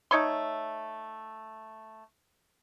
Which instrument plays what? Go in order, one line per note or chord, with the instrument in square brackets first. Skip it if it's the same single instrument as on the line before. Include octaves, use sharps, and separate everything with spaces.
[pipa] A3 D#4 C#5 C6